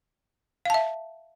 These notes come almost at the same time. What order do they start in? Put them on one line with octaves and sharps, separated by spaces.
F5 A5 E5